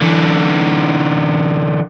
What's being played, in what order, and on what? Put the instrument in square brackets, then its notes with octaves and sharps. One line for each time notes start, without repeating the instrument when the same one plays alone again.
[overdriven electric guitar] D3 E3